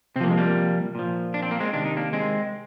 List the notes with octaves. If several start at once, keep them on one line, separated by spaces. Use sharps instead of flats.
C3 F3 A#3 C4
G#3
G3 A#3
A#2 F3
D4
C4
A#3
G#3 C4
C3 D#3 D4
D#4
A#3 D4
G#3 C4